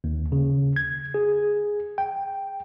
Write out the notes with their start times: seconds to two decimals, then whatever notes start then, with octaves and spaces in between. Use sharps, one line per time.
0.04 D#2
0.32 C#3
0.76 G#6
1.14 G#4
1.98 G5